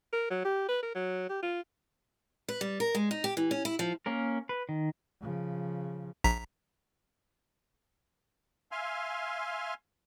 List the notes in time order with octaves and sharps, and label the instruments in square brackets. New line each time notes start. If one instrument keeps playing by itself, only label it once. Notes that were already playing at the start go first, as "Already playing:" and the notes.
[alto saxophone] A#4
F#3
G4
B4
A#4
F#3
G4
F4
[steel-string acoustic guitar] B4
G3
A#4
G#3
D#4
G4
E3
C#4
E4
F3
[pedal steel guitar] A#3 C#4 A#4
B4
D#3
[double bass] C#3 F3
[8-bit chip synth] A#1 A#5 B6
[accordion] E5 F5 G#5 C6 F6